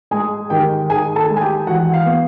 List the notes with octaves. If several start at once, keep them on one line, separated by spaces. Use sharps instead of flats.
G#3 G#4 G#5
D#3 G4 G5
D#3 G#4 G#5
A4 A5
G#3
G#5
G4 G5
E3 F#4 F#5
F5
B3